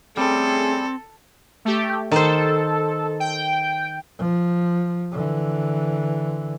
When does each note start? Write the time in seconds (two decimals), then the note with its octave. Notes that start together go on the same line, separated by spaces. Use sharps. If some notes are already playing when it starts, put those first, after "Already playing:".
0.17 G3 A3 C4 C#4 G#4 A4
1.65 A3 G4
2.11 D#3 A4 C5
3.20 G5
4.18 F3
5.12 D3 E3